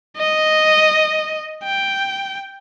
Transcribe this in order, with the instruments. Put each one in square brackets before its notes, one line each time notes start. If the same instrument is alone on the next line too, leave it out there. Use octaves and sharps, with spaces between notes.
[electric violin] D#5
G5